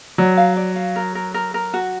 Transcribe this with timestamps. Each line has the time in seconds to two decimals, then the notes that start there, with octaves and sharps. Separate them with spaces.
0.18 F#3 D5
0.37 F5
0.56 D5
0.76 F5
0.96 A#4
1.15 A#4
1.34 A#4
1.54 A#4
1.74 F#4